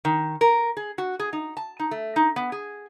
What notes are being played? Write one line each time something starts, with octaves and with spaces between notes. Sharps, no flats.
D#3
A#4
G#4
F#4
G#4
D#4
A5
D#4
A3
D#4
B3
G#4